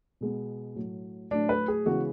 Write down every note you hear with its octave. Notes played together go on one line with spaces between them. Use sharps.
B2 G#3 B3
A2 F#3 A3
A2 F#3 A3 D4
B4
G#4
C#3 E3 G#3 B3 F#4